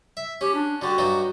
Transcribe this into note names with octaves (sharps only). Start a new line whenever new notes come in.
E5
C#4 G4
D4
D3 G3 F#4
G2 F#3 D#4